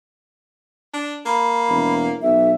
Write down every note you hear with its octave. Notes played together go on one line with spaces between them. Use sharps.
D4
A#3 B5
E1
B1 E5